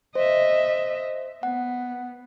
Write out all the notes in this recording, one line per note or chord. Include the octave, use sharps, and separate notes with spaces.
C5 D#5 E5
B3 F#5